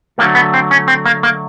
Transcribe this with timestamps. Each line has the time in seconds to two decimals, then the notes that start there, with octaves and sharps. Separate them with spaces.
0.18 D3 F#3 A3 A#3
0.35 B3
0.54 C4
0.71 C#4
0.88 C4
1.05 A#3
1.23 A#3